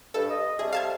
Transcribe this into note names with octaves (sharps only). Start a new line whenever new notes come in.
G2 A4
D#5
C3 G3 A3 G#4
F5 A5 G#6